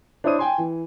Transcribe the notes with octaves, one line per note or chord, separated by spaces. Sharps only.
D4 E4 C5 C#5 D#6 D#7
G5 G#5 C6
E3